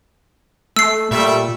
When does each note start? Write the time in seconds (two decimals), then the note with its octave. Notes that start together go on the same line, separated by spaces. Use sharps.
0.77 A3 E6 C7
1.11 A#2 G3 A3 E5